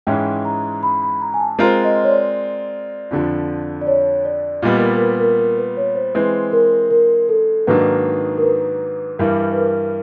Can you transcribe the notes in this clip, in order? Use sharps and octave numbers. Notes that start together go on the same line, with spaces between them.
G#2 E3 G#3 C#4 E4 G5
A#5
B5
B5
A#5
G#5
A5
G#3 C4 F4 A#4
D#5
C#5
D5
F2 D3 F3
D5
C#5
D5
A#2 G3 B3 D#5
A#4
B4
A#4
B4
A#4
A#4
B4
C#5
C5
E3 G#3 C4 B4
A#4
A#4
A4
G#2 D#3 F#3 A#3 D4 B4
A#4
B4
G2 E3 G3 A#4
B4
A#4